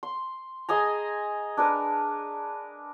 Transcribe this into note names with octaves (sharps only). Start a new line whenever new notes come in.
C6
G#4 D#5 G#5 A#5
D4 A#4 B4